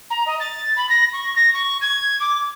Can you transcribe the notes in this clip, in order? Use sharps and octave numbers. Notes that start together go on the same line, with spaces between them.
A#5
D#5
A6
B5
A#6
C#6
A#6
C#6
G#6
D6